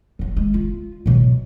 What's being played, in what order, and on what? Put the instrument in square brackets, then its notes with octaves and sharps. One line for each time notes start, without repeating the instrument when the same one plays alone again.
[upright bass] F3 F#3
G#3
F4
B2 F#3